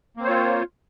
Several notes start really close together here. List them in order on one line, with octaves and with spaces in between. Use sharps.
A#3 C4 C5 C#5 F4